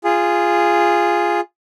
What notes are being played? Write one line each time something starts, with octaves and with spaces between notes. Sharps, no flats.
F4 G#4